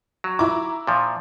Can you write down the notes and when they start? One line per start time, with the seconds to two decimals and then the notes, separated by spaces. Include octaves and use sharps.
0.24 F#3
0.39 E4 A#5 D6
0.87 A#2 F3